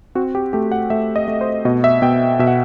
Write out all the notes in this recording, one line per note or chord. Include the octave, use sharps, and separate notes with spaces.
C4 F#4
G4
A3 G4
F#5
A3 E5
D#5
A3
C5
B2 D#5
E5
B2 G5
B2 E5
F#5